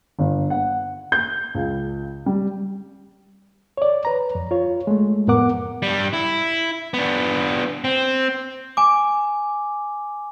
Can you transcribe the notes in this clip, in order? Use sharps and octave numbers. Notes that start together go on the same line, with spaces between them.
G1
F#5
G6
C#2
G3
C#5 D5
B4 A#5
F2
F4 C#5
G#3 A3
F2 A2 B3 A#4 F#5 D6
G2 G3
E4
B3 D4
C4
G#5 D6